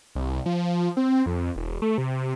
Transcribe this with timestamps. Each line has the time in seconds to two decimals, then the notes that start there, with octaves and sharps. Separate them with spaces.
0.15 C2
0.46 F3
0.97 C4
1.26 F2
1.56 E1
1.82 A3
1.98 C3